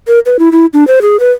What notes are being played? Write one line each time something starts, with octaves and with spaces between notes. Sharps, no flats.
A#4
B4
E4
E4
D4
C5
G#4
B4